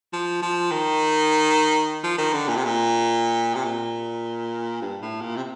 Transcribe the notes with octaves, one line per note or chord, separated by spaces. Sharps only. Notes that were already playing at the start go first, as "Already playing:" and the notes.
F3
F3
D#3
F3
D#3
D3
A#2
C3
A#2
C3
A#2
G2
A2
A#2
C3